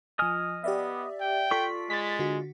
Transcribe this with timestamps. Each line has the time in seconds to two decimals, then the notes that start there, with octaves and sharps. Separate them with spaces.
0.19 F3 D#5 G#5 D#6 F6
0.64 B3 G4 D5 E5
1.21 G5
1.51 F4 A4 D5 C#6 B6
1.90 G#3 A6 B6
2.19 D3 F#4